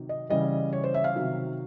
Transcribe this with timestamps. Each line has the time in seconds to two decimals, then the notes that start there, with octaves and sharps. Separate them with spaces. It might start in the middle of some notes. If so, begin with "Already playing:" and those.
Already playing: C3 D#3 F#3
0.09 D#5
0.30 C#3 E3 G3 D#5
0.73 C#5
0.84 C5
0.94 E5
1.04 F5
1.16 C3 D#3 F#3